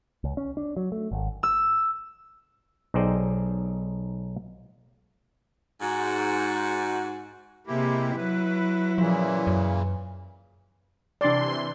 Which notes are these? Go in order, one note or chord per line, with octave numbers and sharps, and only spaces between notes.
C#2
C#4
D4
F#3
A3
G#1
E6
B1 D#4 G#4 C5 D5 G5
G#2 F#4
C3 G#3 A#3 E4 G4
F#3 E4 B4
A#2 C#3 E3 F3
F#2
C3 E3 D4 D5 C6